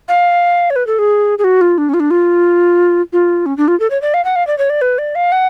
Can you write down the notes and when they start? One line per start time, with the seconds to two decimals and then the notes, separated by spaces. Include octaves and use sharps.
0.08 F5
0.70 C#5
0.76 B4
0.87 A4
0.99 G#4
1.38 G#4
1.44 F#4
1.61 F4
1.78 D4
1.89 C#4
1.94 F4
2.00 D4
2.10 F4
3.13 F4
3.46 C#4
3.57 D4
3.68 F4
3.80 A4
3.90 C#5
4.02 D5
4.14 F5
4.24 F#5
4.36 F5
4.47 D5
4.58 C#5
4.70 D5
4.81 B4
4.98 D5
5.15 F5
5.32 F#5